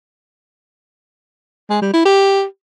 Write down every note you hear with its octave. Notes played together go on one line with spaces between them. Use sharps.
G#3
G3
E4
G4